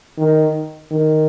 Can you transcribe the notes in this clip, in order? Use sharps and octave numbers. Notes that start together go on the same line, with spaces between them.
D#3
D#3